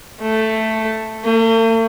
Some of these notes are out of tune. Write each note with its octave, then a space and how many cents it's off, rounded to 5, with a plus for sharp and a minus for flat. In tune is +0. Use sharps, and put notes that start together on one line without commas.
A3 +5
A3 +45